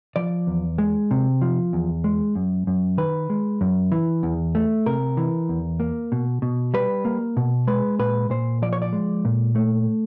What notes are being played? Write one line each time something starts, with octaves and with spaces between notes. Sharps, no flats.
F3 D5
E2
G#3
C3
F3
E2
G#3
F#2
F#2
D#3 B4
G#3
F#2
E3
E2
A3
C3 A#4
E3
E2
A#3
B2
B2
G3 B4
A#3
B2
G#3 B4
A#2 B4
A#2 C5
F3 D5
C#5
D5
G#3
A#2
A3